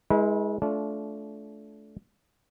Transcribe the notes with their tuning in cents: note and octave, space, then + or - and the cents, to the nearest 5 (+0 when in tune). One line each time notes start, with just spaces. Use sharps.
G#3 +0 E4 -35 B4 -35
A3 -25 D4 -35 F4 -10